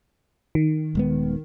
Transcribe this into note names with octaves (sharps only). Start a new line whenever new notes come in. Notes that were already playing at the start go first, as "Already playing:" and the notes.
D#3
D#1 G#3 B3